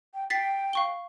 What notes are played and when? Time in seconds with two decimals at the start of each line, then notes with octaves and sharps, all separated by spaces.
0.14 G5
0.30 G5 A6 B6 C7
0.73 F5 C#6 G7